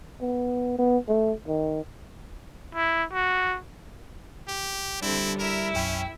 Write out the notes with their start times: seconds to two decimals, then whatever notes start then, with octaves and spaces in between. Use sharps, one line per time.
0.21 B3
0.79 B3
1.08 A3
1.47 D#3
2.75 E4
3.13 F#4
4.48 G4
5.02 D3 G3 C4 D4 E4
5.39 E4 A#4 E5
5.74 B1 F#2 C#4 G5